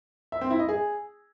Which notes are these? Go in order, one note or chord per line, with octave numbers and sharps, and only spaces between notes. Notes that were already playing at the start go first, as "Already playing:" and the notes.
E5
C4
E4
D#5
G#4